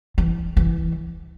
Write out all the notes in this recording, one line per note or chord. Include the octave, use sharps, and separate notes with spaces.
E3
E3